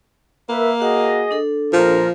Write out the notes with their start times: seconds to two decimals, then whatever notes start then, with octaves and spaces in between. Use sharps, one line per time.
0.49 A#3 A#4 B4 E5
0.81 F#4 G#4 D#5 F#5
1.31 D4 A4
1.73 A#1 F3 F4 A#4